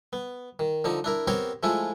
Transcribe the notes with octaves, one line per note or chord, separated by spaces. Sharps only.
B3
D#3
D3 F3 D#4
D4 E4 A#4
B3 C4 G4 A#4 C5 C#5
F3 G#3 A3 E4 F4